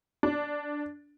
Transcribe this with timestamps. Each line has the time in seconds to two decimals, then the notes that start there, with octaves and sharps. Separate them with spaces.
0.23 D4